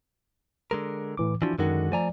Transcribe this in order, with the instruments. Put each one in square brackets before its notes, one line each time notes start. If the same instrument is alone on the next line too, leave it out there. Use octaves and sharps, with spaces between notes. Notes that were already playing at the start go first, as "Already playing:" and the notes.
[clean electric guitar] D3 G#3 A#4
[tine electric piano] A2 E3 D6
[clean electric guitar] E3 F3 [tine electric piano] D4 E4 F#4
[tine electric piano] F#2 D#3 [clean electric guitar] D3 G#3 F#4
[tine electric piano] F3 D5 [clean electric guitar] A3 G#5 A#5